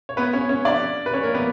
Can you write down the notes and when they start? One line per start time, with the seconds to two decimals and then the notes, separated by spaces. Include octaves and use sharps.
0.09 C#5
0.17 B3 B4
0.33 C#4 C#5
0.49 C#4 C#5
0.65 D4 D5
1.06 B4
1.13 C#4 C#5
1.23 A#3 A#4
1.35 B3 B4